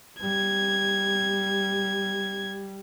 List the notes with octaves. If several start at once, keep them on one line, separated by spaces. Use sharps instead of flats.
G3 G#6